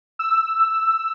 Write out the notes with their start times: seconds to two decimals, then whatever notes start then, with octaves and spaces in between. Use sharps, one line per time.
0.19 E6